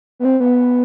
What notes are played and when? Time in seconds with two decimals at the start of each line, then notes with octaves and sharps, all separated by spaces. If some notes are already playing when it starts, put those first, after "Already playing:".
0.20 B3
0.25 C4
0.40 B3